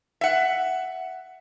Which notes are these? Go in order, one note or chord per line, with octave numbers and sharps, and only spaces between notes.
E5 F#5